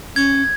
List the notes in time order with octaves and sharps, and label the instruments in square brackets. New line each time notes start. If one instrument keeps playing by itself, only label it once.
[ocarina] C#4 [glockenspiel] G#6